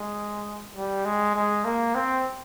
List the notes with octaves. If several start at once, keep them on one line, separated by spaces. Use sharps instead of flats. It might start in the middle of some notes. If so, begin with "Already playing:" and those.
Already playing: G#3
G3
G#3
G#3
A#3
C4